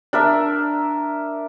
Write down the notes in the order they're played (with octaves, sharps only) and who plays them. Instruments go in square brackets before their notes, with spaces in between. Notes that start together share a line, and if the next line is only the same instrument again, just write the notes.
[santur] D4 A#4 E5